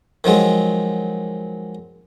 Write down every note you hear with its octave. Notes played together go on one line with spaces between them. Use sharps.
D#3 F3 F#3 G#3